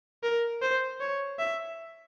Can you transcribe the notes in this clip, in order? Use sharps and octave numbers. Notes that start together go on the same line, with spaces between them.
A#4
C5
C#5
E5